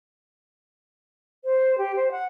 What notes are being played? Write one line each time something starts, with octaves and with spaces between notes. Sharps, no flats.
C5
G4
C5
F#5